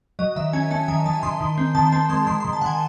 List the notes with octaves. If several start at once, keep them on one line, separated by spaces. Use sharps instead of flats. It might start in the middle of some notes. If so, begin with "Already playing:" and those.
F#3 D#5
D#3 E5
C#4 G#5
C#4 A5
D#3 G#5
D#3 A5
D#3 C6
D#3
C4
D#3 A5
C4 A5
G#3 C6
D#3 C6
C6
D#3
A5
D#3 F#5 G#5